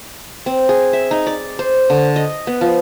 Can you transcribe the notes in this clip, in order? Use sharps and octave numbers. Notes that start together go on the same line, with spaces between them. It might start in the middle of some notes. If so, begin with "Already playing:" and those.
C4
G#4
E5
D#4
D5
C5
D3
D#5
B3
F3